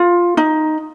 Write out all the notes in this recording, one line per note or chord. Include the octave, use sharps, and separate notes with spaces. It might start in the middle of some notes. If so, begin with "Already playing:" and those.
Already playing: F4
D#4